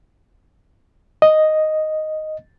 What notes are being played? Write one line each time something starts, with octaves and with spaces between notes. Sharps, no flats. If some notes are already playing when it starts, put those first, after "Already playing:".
D#5